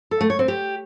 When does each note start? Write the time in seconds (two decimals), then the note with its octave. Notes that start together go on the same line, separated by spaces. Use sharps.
0.11 A4
0.21 A3
0.30 C#5
0.39 C4
0.48 G4